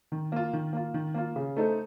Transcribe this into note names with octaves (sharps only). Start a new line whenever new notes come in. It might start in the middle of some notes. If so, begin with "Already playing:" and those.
D#3
A#3 F4
D#3
A#3 F4
D#3
A#3 F4
C#3
A3 D#4 A4 C5